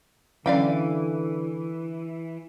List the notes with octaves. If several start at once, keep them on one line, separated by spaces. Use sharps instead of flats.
D3 E3 F#3 C#4 D4 D5 F5 G5